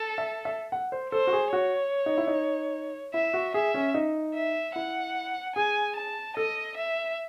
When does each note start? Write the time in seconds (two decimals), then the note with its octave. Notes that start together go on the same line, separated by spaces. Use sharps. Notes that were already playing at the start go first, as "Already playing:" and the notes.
Already playing: A4
0.18 E5
0.45 E5
0.72 F#5
0.92 C5
1.12 A4 C5
1.27 F#4
1.33 G#4
1.53 F#4 C#5
2.06 D#4
2.18 E4
2.27 D#4
3.14 E4 E5
3.34 F#4
3.54 G#4 E5
3.74 C#4
3.94 D#4
4.35 E5
4.75 E4 F#5
5.56 G#4 G#5
5.96 A5
6.37 A4 D#5
6.77 E5